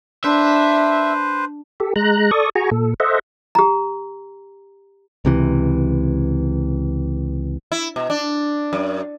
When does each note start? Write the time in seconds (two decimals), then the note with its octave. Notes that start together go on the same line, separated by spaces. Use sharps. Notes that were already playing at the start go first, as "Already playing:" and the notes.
0.24 D4 B4 C5 E5
1.80 G4 A4
1.96 G#3 A#5 F#6
2.31 A4 D5 C#6 D#6
2.55 F#4 G#4 G#5 A#5 C#6
2.71 A#2 A4
3.00 A4 C5 D#5 E5 F#5
3.55 G4 A#5
5.25 C#2 C3 E3
7.72 E4
7.96 B2
8.10 D4
8.73 F#2